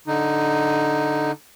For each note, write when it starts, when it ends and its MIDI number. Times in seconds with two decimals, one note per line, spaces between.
0.07 1.32 50
0.07 1.32 63